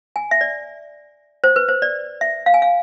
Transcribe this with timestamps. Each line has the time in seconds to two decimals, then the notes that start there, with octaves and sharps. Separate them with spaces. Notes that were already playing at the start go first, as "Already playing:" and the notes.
0.16 G#5
0.31 E5
0.41 D5
1.44 C5
1.56 B4
1.69 C5
1.82 D5
2.21 E5
2.46 F5
2.54 G#5
2.62 F5